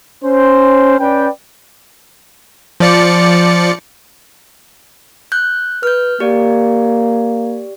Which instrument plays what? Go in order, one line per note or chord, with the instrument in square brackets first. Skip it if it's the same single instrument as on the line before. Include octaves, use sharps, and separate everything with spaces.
[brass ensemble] C#4 C5
C#4 B4 D5 G5
[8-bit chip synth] F3 D5 C#7
[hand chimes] F#6 G6
[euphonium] B4 [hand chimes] F6 G6
[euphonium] A#3 [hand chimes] G4 D5